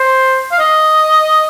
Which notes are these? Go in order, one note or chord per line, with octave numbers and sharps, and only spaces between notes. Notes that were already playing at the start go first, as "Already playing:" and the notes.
Already playing: C5
F5
D#5